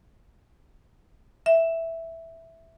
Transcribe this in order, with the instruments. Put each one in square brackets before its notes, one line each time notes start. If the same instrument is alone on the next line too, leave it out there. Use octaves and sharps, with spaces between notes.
[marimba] E5